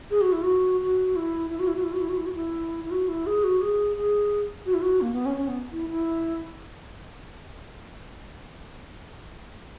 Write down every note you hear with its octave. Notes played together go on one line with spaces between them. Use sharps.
G#4
F#4
E4
F#4
F#4
E4
E4
F#4
E4
F#4
E4
F#4
E4
F#4
E4
F#4
E4
E4
F#4
E4
G#4
F#4
G#4
G#4
F#4
E4
F#4
A#3
B3
C#4
C#4
B3
E4
E4